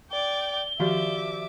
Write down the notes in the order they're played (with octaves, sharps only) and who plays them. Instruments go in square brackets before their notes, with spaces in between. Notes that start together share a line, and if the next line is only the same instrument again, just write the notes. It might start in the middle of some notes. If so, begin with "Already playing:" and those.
[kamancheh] D5 G5 [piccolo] G7
[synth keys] D#3 F3 D5 [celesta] F#4 G4 F5 [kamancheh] E5 D6